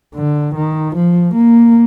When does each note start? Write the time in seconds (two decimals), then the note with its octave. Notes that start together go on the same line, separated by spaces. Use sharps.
0.15 D3
0.55 D#3
0.96 F3
1.35 A#3